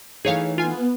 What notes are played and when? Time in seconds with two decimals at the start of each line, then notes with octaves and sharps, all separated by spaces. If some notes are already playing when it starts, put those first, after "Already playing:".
0.25 E3 A3 D#4 G#4 C#5 F5
0.58 B3 F4 G#5